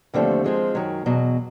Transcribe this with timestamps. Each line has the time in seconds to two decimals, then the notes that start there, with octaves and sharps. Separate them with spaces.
0.14 D#2 D3 F3 A3 C4
0.44 F3 G#3 C4 F4
0.75 F#2 D#3 F#3
1.06 E2 B2 F#3